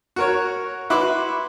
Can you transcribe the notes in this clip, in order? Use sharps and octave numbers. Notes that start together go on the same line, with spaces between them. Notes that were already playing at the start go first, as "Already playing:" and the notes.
F#4 A#4 C#5
E4 F#4 B4 B5 C6 D6